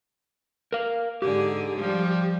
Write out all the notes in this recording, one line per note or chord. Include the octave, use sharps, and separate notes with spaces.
A#4 F5
G#2 D3 G4 G#4
F3 G3